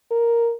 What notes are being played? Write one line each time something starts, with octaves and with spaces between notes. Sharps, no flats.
A#4